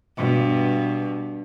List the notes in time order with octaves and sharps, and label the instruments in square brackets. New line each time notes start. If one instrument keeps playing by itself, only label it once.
[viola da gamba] G2 B2